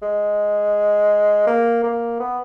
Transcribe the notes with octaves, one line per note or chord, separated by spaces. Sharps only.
G#3
A#3
A#3
B3